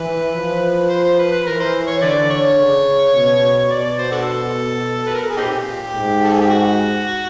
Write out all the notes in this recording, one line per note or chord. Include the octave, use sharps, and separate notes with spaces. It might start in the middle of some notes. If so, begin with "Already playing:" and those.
Already playing: E3 B4
F3
C5
C5
B4
B4
E3 A#4
C5
C#5
D3 A4 B4 D5
C#5
C#3
B2
B2 D5
D5
C5
D4 F#4 A4
B4
A#4
A4
G#4
A#2 C4 D#4 G4
G#2
A4
G#4
G4
F#4